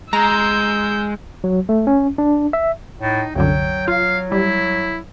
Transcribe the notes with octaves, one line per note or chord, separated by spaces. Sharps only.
G#3 A#5 E6 G6
F#3
A3
C#4
D4
E5
A2 D#4
C2 F#2 D3 F#3 G5
F4 F5
G3 E4